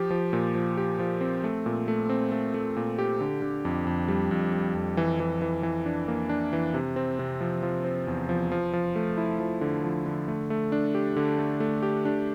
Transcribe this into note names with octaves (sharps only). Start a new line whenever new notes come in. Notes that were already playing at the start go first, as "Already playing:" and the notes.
Already playing: F3 G4
F3
A#2
F3
G4
F3
C4
A3
A#2
A3
C4
A3
A3
A#2
G4
D3
D3
F2
F2
G3
F2
G3
F2
E3
E3
E3
E3
D4
A#3
D4
E3
C3
C4
C3
F3
F3
C4
E2
F3
F3
F3
A3
E4
F3
D3
F3
D3
A3
A3
D4
G4
D3
A3
A3
G4
D4